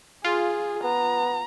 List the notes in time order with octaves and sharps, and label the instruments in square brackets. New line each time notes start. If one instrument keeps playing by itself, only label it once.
[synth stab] F4 [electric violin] G#4
[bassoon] B3 [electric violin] A#5